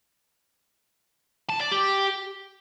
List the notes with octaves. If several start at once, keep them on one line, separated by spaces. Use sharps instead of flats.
A5
D5
G4